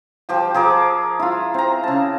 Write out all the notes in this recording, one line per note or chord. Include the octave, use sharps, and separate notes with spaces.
F3 G4 G5
F3 G#4 A#4 D6
E4 F4
C4 A#5
C#3 A5